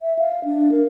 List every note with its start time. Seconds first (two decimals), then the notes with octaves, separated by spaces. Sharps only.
0.01 E5
0.19 F5
0.45 D4
0.72 A#4